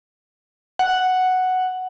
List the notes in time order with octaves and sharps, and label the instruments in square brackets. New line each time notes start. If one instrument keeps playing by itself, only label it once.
[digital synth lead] F#5